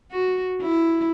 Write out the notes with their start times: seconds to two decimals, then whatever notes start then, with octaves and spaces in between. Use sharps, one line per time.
0.11 F#4
0.61 E4